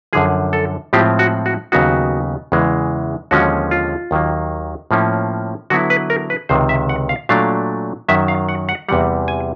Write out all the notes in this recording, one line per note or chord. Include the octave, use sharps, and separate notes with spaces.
F#2 D3 F3 G#4
A4
A2 F3 G#3 C4 F4 G4
F#4
F#4
D#2 C#3 F#3 B3 D#4 F#4
E2 C#3 E3 G#3
D#2 D3 F3 G#3 C#4 F#4
F4
D#2 D#3 F#3 A#3
A2 F3 A#3 C#4
D3 F#3 B3 E4 F#4
B4
A#4
B4
C#2 C3 D#3 C5
E5
F#5
F5
A#2 F#3 A3 D4 F5
F#2 D#3 F#3 E5
F5
F#5
F#5
E2 C3 E3 G3 F#5
G#5